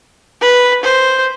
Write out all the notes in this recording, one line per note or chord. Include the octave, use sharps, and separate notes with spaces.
B4
C5